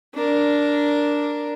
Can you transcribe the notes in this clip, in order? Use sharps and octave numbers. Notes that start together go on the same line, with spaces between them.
D4 A#4